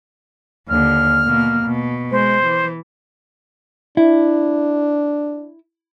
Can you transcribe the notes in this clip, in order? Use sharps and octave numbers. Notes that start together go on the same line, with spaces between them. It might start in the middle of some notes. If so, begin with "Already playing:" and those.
D#2 D3 F6
B2 A#3
B2
G#3 C5
E3
D4 E4